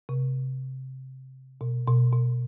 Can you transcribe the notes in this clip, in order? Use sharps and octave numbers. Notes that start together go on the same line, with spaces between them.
C3
B2
B2
B2